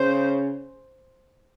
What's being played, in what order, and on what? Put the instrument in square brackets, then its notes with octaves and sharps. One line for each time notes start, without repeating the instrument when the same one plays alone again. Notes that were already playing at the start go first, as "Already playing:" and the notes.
Already playing: [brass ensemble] C#3 C#4 [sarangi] C5